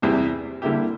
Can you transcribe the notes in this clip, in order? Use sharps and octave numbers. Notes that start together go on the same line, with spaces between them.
E2 C3 G3 C4 E4
D3 G3 A#3 E4 G4